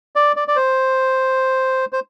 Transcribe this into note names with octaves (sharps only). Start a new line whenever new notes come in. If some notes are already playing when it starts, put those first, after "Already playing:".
D5
D5
D5
C5
C5